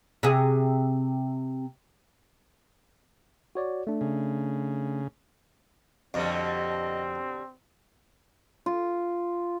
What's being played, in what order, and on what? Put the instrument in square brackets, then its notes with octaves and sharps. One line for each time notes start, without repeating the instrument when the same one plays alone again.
[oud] C3 G#4
[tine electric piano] F#4 C#5 D5
A3 D4
[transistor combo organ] C#3
[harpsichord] F2 [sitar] B2 D3 G3 [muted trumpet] C4 [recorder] D#5
[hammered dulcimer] F4